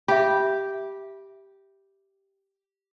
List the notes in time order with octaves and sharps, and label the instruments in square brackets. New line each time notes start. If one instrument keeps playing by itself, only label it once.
[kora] G4 [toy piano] E5 B5